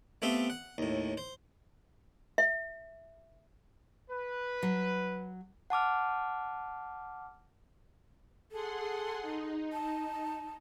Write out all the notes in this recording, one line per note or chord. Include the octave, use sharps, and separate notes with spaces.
A3 B3 C4 G4 E5 F5
F#5
D#2 A2
C5
E5
B4
F#3
F#5 A5 D6 F6
G#4 A4 F#5 C6
D#4
A5